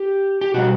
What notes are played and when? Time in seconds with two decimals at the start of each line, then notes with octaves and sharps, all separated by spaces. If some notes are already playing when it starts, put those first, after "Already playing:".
Already playing: G4
0.41 G4
0.54 B2 G3 F#4